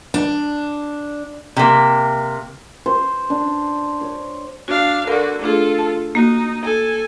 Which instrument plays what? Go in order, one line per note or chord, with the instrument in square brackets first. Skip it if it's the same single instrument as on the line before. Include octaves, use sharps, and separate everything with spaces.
[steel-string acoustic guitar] D4
[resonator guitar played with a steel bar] C3 A#3
[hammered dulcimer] C5
D4
C#5
[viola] D4 F5 [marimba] F#4
[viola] D3 F#4 [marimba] A#4 D5
[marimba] A3 D4 G#4 [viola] F4 A4
[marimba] A5
[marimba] A#3 F#4 [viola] D#4
[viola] A4 G#5